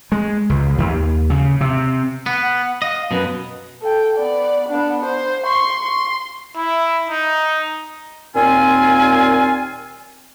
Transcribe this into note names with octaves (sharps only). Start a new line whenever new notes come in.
G#3
C#2
D#2
C#3
C3
B3 F#5
F#5
D#5 F5
F#2 B2 B4
A4 G5
B3 D5
B3 D4
C5
C6 C#6
C6
E4
D#4
D#2 A#2 C4 F4 G#5